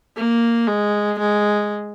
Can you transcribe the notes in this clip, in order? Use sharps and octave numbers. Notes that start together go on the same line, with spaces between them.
A#3
G#3
G#3